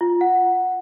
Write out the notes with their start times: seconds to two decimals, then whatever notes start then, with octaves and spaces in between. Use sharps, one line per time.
0.01 F4
0.21 F#5